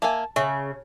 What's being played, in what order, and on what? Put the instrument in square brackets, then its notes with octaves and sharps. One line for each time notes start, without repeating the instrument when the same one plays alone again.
[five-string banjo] A#3 E5 G#5 [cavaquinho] A5
[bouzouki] C#3 [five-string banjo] E5 [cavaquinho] C#6